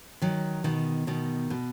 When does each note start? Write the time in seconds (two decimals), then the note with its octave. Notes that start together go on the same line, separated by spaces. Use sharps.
0.22 D#3 F#3
0.64 B2 D#3
1.07 B2 D#3
1.50 B2